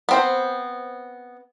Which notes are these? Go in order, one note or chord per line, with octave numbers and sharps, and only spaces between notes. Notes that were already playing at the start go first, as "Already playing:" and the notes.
B3 C4 C5